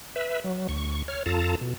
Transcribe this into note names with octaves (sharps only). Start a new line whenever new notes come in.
B4 E5
F#3
D2 C#6
C#5 F6
F2 F4 A4 A5 A#5
B2